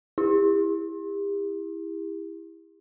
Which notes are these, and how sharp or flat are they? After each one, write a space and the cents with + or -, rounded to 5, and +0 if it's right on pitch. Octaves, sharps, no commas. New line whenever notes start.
E4 +0 G4 +40